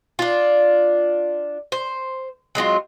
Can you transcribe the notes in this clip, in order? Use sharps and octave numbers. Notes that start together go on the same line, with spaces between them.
D4 F4
C5
F#3 G#3 C4 F4